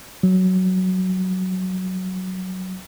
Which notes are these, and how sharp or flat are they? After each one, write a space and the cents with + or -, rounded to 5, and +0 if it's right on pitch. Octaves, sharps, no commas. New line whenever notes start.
F#3 +5